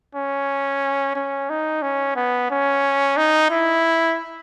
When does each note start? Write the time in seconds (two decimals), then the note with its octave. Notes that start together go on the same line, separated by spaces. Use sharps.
0.15 C#4
1.15 C#4
1.50 D#4
1.82 C#4
2.16 B3
2.51 C#4
3.17 D#4
3.50 E4